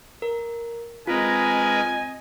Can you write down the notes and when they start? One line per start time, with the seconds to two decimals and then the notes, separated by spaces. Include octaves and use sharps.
0.22 A#4
1.07 G#3 C4 F4 A#4 B4 D#5 G#5